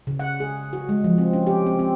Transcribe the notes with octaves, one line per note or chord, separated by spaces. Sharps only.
C#3
F#5
G#4
F#4
G#3
F3
C4
C#4
G4
C4
C4